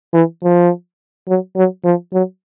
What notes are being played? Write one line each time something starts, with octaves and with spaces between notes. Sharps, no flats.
E3
F3
F#3
F#3
F3
F#3